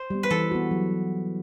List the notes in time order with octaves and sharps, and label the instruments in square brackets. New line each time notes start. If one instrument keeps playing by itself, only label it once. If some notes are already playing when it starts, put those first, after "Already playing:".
Already playing: [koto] C5
[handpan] G3 B3
[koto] B4
[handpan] E3 [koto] A4
[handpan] B3 F#4
F#3